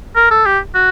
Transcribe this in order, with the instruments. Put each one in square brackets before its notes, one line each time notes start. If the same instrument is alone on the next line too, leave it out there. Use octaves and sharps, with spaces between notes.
[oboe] A#4
A4
G4
F#4